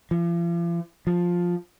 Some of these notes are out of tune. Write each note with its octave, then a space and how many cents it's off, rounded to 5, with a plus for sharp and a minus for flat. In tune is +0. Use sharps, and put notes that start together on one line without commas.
F3 -40
F3 +10